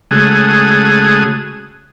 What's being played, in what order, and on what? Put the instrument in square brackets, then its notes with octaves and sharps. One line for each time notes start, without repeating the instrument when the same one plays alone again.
[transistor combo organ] C#3 G#3 A3 F#4 G#4 D#6